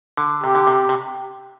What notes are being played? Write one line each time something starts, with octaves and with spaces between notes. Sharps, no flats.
D3
C3 G4
D3
C3
C3